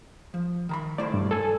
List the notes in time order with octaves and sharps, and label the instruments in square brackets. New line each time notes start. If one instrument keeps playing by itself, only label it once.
[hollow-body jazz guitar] F3
D#3 A#5 B5
[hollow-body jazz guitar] A3 E4 C5 [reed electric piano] D5
[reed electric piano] G2
A4 G#5